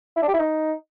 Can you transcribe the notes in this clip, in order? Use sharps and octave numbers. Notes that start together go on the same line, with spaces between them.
E4
D4
G4
E4
D#4